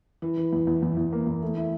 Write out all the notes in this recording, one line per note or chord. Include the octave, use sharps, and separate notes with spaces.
E3
E3
E2
E2
E2
E2
A#3
E2
A3
E4